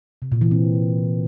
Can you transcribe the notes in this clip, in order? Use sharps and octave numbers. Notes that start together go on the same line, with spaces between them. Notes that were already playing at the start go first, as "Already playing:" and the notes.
C3
A#2
E3
C4